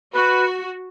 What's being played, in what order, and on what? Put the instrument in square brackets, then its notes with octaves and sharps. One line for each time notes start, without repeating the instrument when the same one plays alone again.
[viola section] F#4 [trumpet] B4